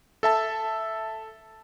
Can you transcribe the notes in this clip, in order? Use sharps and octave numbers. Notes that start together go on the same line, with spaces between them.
A4 E5 A5